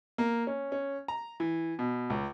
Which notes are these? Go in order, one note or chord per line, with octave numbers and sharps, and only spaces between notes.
A#3
C#4
C#4
A#5
E3
B2
C#2